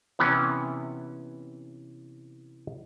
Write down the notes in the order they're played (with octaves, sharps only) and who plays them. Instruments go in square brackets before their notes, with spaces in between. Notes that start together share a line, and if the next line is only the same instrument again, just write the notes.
[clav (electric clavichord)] C3 E3 B3 C#4